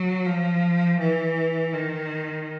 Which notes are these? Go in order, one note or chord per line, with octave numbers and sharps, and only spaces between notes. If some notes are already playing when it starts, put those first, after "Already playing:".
Already playing: F#3
F3
E3
D#3